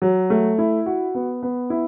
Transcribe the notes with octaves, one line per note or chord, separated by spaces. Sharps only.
F#3
A3
E4
F#4
B3
B3
E4